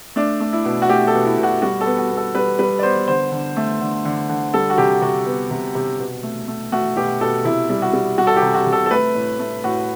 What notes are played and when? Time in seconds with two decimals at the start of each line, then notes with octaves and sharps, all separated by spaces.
0.16 A3 D4
0.40 A3
0.53 E4
0.65 B2
0.82 F#4
0.89 A3 G4
1.07 A4
1.14 B2
1.25 E4
1.38 B2
1.43 F#4
1.62 G3 F#4
1.81 A4
1.86 B3
1.98 F#4
2.11 B3
2.17 A4
2.35 G3 B4
2.59 G3 B4
2.79 D5
2.83 B3 C5
3.07 D3 C5
3.32 D3
3.57 A3
3.81 D3
4.05 D3
4.29 D3
4.54 G3 A4
4.70 F#4
4.78 C3 G4
5.02 C3 F#4
5.26 B3
5.51 C3
5.75 C3
6.00 B2
6.23 A3
6.48 A3
6.72 A3 F#4
6.97 B2 G4
7.20 B2 A4
7.45 C3 E4
7.70 G3
7.82 F#4
7.93 G3
8.18 G3 F#4
8.27 A4
8.36 G4
8.42 C3
8.54 F#4
8.66 C3
8.72 A4
8.86 A4
8.91 A3 B4
9.15 A2
9.39 A3
9.64 A2 F#4